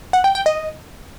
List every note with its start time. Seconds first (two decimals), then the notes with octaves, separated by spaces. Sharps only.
0.13 F#5
0.24 G5
0.35 G5
0.46 D#5